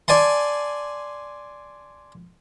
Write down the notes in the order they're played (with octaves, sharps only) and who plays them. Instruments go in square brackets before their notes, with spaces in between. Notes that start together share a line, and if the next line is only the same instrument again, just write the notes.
[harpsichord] D5 G#5 A5 C6